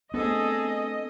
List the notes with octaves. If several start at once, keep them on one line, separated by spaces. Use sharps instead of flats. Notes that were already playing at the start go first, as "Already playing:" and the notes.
A3 B3 C4 D4 G#4 A4 D#5